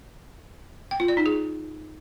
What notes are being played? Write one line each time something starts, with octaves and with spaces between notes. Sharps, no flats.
G5
F4
D5
D#4
G#4